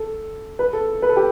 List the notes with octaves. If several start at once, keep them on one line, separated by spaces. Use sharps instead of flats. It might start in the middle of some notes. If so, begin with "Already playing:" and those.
Already playing: A4
B4
A4
B4
A4
G4